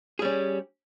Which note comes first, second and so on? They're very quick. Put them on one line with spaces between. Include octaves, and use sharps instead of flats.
G#4 G3 C#4